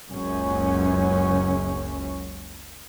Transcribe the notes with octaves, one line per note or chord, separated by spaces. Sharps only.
F#1 C#2 F#2 C#4